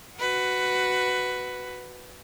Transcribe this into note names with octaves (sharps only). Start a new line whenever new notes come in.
F#4 B4